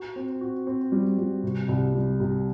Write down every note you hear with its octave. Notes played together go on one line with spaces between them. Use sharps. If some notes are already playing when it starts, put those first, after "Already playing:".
Already playing: F#4
C4
F#4
C4
G3
G3
C3
C2
G3
C3